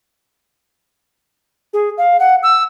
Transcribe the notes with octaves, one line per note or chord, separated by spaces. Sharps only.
G#4
F5
F#5
E6